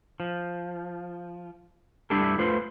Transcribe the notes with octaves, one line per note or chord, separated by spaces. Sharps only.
F3
G3 A3 D4 E4 G4 A4
A3 F4 B4 C5